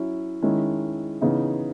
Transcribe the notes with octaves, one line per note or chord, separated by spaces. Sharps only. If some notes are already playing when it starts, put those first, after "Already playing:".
Already playing: F#3 C#4 E4
D#3 G#3 C#4 E4
C#3 E3 B3 D#4